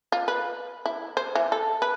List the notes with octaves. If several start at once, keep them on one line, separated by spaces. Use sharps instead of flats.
F4
B4
E4
C5
E3
A4
B4